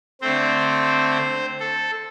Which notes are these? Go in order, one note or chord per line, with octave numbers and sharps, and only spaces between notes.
D3 A3 C4 C5
A4